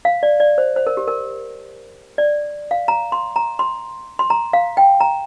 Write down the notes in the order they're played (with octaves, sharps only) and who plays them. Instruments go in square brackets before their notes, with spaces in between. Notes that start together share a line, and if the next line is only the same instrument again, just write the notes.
[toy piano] F5
D5
D5
C5
C5
A#4
G4
A#4
D5
F5
A#5
C6
A#5
C6
C6
A#5
F5
G5
A#5